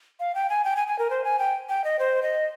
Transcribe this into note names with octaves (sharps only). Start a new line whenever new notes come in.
F5
G5
G#5
G5
G#5
G#5
A#4
C5
G#5
G5
G5
D#5
C5
D#5